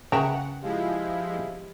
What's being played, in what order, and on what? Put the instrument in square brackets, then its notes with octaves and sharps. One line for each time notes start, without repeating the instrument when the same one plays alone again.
[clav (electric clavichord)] C#3 A#4 E5 [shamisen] B4 G5 A#5 [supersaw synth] F#5
[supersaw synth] F3 G#3 E4 [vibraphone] G4 D#5 F5